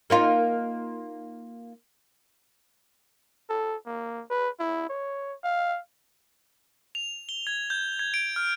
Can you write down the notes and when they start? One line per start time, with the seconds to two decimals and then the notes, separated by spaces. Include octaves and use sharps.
0.10 A#3 D#4 F4
3.50 A4
3.86 A#3
4.31 B4
4.60 E4
4.89 C#5
5.44 F5
6.95 F7
7.29 G7
7.47 G#6
7.70 G6
7.99 G#6
8.14 D7
8.36 F6